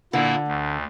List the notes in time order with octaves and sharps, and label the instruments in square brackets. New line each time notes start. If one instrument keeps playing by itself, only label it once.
[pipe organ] A#2 A#3 E4 [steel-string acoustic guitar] D3
[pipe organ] D2